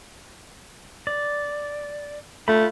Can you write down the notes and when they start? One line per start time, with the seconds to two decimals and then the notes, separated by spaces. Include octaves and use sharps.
1.07 D5
2.48 A3 F4 B5